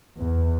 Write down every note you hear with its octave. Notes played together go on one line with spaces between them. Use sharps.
E2